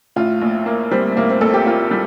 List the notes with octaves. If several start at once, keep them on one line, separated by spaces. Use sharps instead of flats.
A2 F4
A#1
A#3
G3 C4
A2 A#3
C4
A#1 A4
G4
A#3 F4
G3